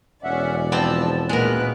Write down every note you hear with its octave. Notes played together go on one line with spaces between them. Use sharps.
E1 C#4 D5 E5 F#5
F3 B3 C4 A5 E6
D2 A#2 D#3 G#3 B3 A#4 F#6